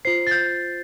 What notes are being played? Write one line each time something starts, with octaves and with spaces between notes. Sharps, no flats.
F4 C5 C7
A6
G6